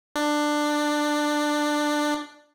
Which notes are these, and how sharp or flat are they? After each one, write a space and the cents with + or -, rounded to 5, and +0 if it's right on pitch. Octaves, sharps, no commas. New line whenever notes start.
D4 +15